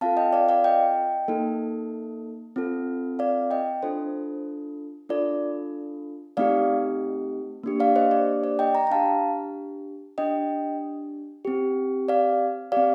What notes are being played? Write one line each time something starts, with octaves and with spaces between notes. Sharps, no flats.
C4 F4 A4 F5 A5
D#5 G5
D5 F5
D5 F5
D#5 G5
A#3 D#4 A4
C4 F4 A4
D5 F5
D#5 G5
D4 F4 A4 C5
D4 F4 A4 D5
A3 C4 D#4 G4 D5 F5
A#3 D4 G4
D5 F5
C5 D#5
D5
D5
D#5 G5
G5 A#5
A#5
D4 G4 F5 A5
D4 G4 D#5 G5
C4 G4
D5 F5
C4 G4 D5 F5